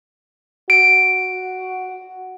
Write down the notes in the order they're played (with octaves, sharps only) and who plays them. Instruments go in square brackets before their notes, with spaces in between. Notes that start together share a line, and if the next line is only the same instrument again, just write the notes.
[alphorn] F#4 [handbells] D7